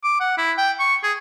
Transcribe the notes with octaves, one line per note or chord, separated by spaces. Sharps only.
D6
F#5
E4
G5
C#6
G#4